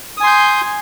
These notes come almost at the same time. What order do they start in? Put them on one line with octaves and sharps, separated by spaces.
D#6 G#5 C6 G6